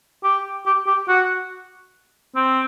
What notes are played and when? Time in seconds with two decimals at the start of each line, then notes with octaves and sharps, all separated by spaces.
0.24 G4
0.66 G4
0.87 G4
1.08 F#4
2.36 C4